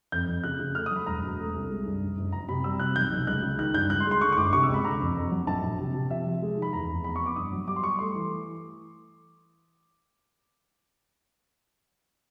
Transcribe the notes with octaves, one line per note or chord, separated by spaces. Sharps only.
F2 G6
F2
C#3 F#6
C#3
A3 F6
D#6
F#3 B5
E1 A#5
E1
A3
C2
G#3
G2
F#1
F#1
F#1 A#5
C3 B5
G3 E6
C3 F#6
B1 G6
B1
C#2 F#6
C#3
D#3 F#6
G2 G6
C#2 F#6
C6
G#3
C6
D3 C#6
C#6
G1 D6
C3 C#6
E6
C#2
B5
D3 A#5
F2
F2
F#3
A#1 A5
A#1
C3
C3
F3 E5
F3
G#3
D#3
B5
E2 A#5
F1
B3 B5
C#6
B3
D6
G2 D#6
F#3
G3 D6
C6
G3 C#6
A3 C6
E3